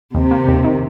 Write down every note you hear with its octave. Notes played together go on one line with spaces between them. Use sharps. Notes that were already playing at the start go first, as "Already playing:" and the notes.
D#2 C3
A#3
D#2
D#3